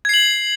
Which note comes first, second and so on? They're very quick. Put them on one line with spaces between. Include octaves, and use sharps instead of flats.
G#6 C7 F#7